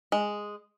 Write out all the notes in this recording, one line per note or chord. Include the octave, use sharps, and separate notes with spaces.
G#3